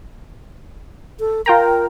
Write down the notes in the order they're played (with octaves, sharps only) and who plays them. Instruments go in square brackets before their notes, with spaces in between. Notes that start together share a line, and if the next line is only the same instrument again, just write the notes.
[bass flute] A4
[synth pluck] F4 G5 A#5 [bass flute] A#4